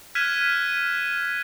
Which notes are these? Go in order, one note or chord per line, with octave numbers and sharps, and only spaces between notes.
F6 F#6 G#6 B6 D#7 E7